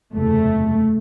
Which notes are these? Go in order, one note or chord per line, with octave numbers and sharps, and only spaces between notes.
F#1 E2 C3 A3